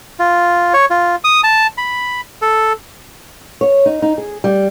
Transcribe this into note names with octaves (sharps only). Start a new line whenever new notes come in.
F4
C#5
F4
D#6
A5
B5
A4
C#5
D#4
D#4
G#4
G3